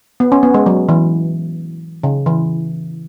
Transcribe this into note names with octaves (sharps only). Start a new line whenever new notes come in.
B3
C#4
B3
G#3
F#3
E3
C#3
E3